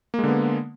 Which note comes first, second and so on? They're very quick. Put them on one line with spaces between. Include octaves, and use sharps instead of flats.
A#3 G#3 D3 B3